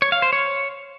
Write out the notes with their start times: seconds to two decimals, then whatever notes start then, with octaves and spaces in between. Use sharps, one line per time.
0.02 C#5
0.12 F5
0.22 C5
0.33 C#5